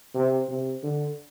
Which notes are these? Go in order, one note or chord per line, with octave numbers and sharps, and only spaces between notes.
C3
C3
D3